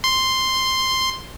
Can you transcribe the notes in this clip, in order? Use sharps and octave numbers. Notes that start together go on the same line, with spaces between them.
C6